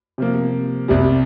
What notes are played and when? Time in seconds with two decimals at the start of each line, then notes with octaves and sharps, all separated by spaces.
0.18 C3 F3 A#3
0.88 C2 C3 G3